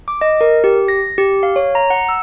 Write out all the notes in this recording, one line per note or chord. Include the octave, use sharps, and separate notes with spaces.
D6
D#5
A#4
G4
A#6
G4
F5
C#5
A#5
F#5
E6